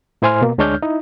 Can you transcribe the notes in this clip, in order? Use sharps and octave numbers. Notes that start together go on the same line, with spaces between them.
A2 E4 C5 G#5 C6 F6
B2 A#3
D2 G#3 D4 C#5 F6 G6
D#4 E4